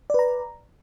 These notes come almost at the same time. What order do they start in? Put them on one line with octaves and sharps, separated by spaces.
D5 B4 A#5